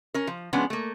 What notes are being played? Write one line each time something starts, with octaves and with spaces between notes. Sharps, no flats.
C#4 A#4
F3
F3 G#3 B3 C#4 D4
A3 A#3